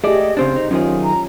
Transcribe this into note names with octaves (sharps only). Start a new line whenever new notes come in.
A3 G4 G#4 D5 D#5
C#3 C4 D4 C5
D#4
F#2 D#3 C#4 F4 G#4
A#5